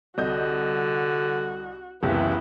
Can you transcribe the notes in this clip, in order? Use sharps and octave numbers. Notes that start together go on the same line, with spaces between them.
C2 D3 F#4 D#5 G6
F#1 C#2 C3 E3 B3 E4